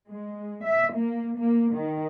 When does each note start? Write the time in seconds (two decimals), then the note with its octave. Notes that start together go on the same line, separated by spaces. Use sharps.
0.11 G#3
0.65 E5
0.97 A#3
1.39 A#3
1.75 D#3